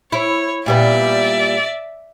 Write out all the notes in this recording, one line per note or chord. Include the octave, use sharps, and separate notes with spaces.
E4 C#5
A#2 G3 B3 D5 E5